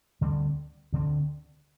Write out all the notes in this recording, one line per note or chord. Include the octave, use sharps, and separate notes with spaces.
D2 D3 G3 C4
D2 D3 G3 C4